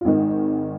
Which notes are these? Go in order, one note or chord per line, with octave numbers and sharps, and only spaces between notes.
F4
G#1 G#2 D#3 D#4